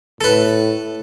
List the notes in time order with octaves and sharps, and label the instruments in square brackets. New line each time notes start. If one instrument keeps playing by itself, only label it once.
[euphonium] A2 [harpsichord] A4 B4